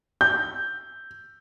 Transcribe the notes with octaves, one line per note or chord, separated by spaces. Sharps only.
G6